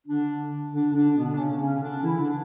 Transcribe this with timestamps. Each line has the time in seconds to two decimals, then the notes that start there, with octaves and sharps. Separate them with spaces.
0.07 D3 D4
0.72 D3 D4
0.94 D3 D4
1.16 B2 B3
1.34 D4
1.37 C#3 C#4
1.59 C#3 C#4
1.81 D3 D4
2.02 E3 E4
2.19 D3 D4